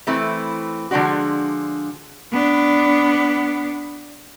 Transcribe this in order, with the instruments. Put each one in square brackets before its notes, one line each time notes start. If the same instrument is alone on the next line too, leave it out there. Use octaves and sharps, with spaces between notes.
[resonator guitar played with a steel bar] E3 A3 C4 E4
D3 F3 G#3 D4 F#4
[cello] B3 D4